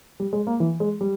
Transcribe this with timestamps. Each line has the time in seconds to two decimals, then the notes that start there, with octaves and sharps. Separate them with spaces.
0.20 G3
0.33 G#3
0.47 A#3
0.60 E3
0.80 G#3
1.01 G3